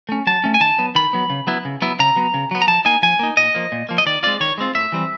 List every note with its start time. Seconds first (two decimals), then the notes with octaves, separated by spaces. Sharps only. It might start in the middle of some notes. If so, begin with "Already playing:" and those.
0.09 A3 C#4
0.27 F#3 A5
0.44 A3 C#4
0.54 G#5
0.60 D#3 A5
0.78 F#3 B3
0.95 D#3 B5
1.13 F#3 B3
1.30 C#3
1.47 F#3 B3 E4
1.65 C#3
1.82 F#3 B3 E4
2.00 C#3 A#5
2.16 F#3 B3
2.34 C#3
2.51 F#3 B3
2.62 A#5
2.67 F3 A5
2.85 A#3 D#4 G#5
3.02 F3 G#5
3.19 A#3 D#4
3.37 A#2 D#5
3.55 F3 A#3
3.72 A#2
3.89 F3 A#3
3.98 D#5
4.06 D#3 D5
4.23 G#3 C4 F4 D5
4.40 D#3 C#5
4.58 G#3 C4 F4
4.75 A2 E5
4.92 E3 G3 C4